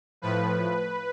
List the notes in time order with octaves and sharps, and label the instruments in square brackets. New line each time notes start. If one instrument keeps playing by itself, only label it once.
[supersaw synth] A2 F3 B4